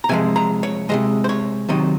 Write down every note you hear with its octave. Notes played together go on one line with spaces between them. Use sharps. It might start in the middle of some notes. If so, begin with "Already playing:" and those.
A#5
C3 F3 G#3 G#5
A#5
C#5
C3 F3 G#3 D#5
C5
C#5
C3 D#3 F#3 D#5